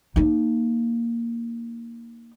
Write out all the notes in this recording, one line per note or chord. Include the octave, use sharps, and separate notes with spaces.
A#3 D#4